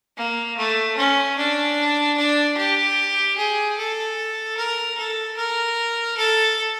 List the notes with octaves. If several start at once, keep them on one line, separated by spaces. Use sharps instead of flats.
A#3
A3
C#4
D4
D4
G4
G#4
A4
A#4
A4
A#4
A4